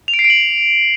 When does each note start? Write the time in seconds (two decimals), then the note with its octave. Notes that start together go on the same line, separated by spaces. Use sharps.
0.08 F7
0.14 D7
0.19 C7
0.24 D7
0.30 F#7